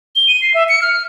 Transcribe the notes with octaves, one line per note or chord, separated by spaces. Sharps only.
G7
D#7
C7
E5
C#7
F6